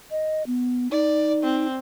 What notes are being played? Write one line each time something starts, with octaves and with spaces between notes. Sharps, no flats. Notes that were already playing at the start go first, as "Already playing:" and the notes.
D#5
B3
D#4 D5
C4